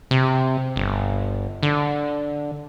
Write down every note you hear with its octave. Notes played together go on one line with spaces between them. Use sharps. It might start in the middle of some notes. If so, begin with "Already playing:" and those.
C3
G1
D3